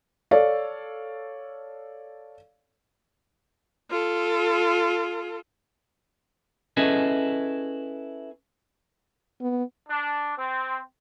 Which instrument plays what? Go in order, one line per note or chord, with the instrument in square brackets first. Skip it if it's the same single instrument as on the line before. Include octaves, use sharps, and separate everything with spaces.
[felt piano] A4 C#5 D5 F5
[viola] F4 A4
[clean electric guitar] C#4 E4 G#4 A4 B4 D#5
[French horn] B3
[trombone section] D4
C4